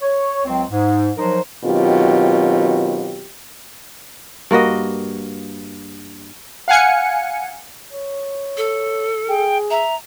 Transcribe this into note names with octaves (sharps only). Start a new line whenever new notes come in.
C#5
C#2 F#3 C4
G#2
F3 F#3 D#4 A#4 C5
B2 D#3 F#3 C4 F4 G4
G2 A#3 F#4 D#5
F5 F#5 G#5 C#7
C#5
A4
G#4 G5
E5 A#5